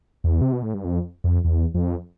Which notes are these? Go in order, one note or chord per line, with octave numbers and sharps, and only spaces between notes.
E2
C3
B2
A2
G2
F2
F2
E2
F2